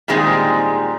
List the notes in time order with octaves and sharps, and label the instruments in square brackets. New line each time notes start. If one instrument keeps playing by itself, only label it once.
[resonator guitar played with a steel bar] A#2 D#3 G3 G#3 C4 G#4